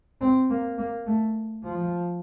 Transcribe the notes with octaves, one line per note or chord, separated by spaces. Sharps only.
C4
A#3
A#3
A3
F3